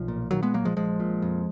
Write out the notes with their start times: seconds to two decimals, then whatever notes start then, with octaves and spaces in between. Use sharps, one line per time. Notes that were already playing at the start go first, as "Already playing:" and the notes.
Already playing: B1 F3
0.08 A#2
0.31 A#2 D#3 F#3
0.43 G#3 B3
0.53 A#1 F#3 A#3
0.65 F3 G#3
0.77 A#1 F3 G#3
1.00 A#2
1.22 F2